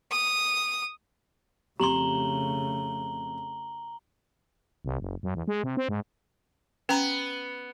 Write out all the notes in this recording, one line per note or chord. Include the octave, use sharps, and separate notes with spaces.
D#6
F2 C#3 A3 G4 A#5 C6 F#7 G7
C2
F#1
F#2
E2
G#3
C3
C4
G#2
B3 C#4 A#5